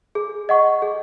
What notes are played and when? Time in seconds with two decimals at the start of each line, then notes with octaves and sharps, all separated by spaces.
0.15 G#4
0.49 D#5 F#5 C#6
0.82 G#4